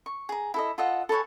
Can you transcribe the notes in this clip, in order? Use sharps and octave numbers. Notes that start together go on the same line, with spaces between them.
C#6
G#4 A#5
E4 A4 D#5
F4 A4 D#5 F#5
A4 B4 C#5 G#5